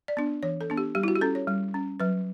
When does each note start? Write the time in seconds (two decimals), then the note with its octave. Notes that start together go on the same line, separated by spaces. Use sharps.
0.08 D5
0.17 B3 D4
0.43 E3 C#5
0.61 A4
0.70 B3 D4
0.78 G4
0.95 G3 G4
1.03 E4
1.08 F#4
1.16 G4
1.21 C#4 A4
1.35 C#5
1.48 G3
1.74 C#4
2.00 F#3 B4